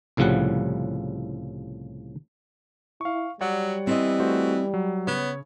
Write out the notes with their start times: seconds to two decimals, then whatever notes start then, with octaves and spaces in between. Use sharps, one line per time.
0.17 C2 A2 C#3 F3 G3 F#5
3.01 E4 F5 C#6
3.41 F#3 G3 C#5 D5 F#5
3.87 E3 C4 D#5
4.20 A3 F#4 C5
4.74 F#3
5.07 C#3 B3 C#5